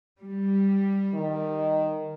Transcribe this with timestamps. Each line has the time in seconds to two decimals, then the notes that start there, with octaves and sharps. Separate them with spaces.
0.20 G3
1.14 D#3